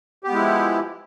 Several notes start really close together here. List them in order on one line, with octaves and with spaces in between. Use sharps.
G4 B3 G#3 E4 F3